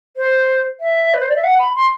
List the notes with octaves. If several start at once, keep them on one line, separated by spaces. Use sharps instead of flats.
C5
E5
B4
C5
D5
E5
F#5
B5
C6